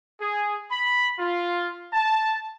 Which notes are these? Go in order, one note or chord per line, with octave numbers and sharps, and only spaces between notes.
G#4
B5
F4
A5